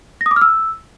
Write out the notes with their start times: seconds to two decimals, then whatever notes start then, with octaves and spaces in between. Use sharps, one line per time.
0.21 A#6
0.26 D#6
0.31 D6
0.36 F6
0.41 E6